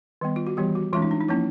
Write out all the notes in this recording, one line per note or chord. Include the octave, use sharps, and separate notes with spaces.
D#3 G3 B3
F4
F#4
E3 G3 B3 G4
F#4
E3 G#3 C#4 F4
D#4
D4
D#4
F3 A#3 C#4 E4